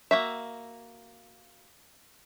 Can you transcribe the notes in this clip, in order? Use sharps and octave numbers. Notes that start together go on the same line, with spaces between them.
A#3 F#4 E5